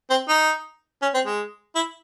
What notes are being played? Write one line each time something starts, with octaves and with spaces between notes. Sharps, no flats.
C4
D#4
C#4
C4
G#3
E4